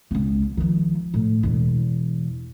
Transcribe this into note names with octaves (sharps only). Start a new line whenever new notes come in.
C#2 B3
D#3 F3
A2
E1 E2